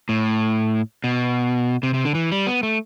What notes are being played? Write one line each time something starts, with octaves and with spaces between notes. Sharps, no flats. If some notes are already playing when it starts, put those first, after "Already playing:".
A2
B2
C3
C3
D3
E3
G3
B3
A3